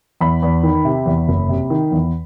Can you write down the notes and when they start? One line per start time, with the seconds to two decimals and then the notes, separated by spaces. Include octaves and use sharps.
0.21 E2 B5
0.42 E2
0.63 D#3
0.85 C3
1.06 E2
1.28 F#1
1.49 C3
1.70 D#3
1.91 E2